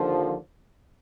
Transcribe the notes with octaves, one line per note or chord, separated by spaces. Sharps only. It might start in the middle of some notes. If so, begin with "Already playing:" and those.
Already playing: D#2 D3 F3